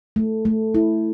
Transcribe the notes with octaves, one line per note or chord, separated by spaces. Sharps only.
A3
A3
E4